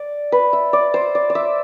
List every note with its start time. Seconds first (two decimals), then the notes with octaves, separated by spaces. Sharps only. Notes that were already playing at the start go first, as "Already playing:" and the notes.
Already playing: D5
0.32 B4
0.53 E5
0.73 D5
0.94 C5
1.15 D5
1.30 D5
1.35 E5